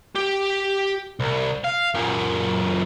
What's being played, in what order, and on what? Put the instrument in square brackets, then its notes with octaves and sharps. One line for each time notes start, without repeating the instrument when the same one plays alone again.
[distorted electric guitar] G4
C2
F5
F#2 A#2